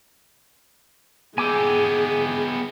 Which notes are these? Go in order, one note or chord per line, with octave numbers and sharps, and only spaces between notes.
B3 G4 G#4 G#5 D6 E6